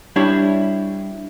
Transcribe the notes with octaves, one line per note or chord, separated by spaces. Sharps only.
G3 D4 E4 C#5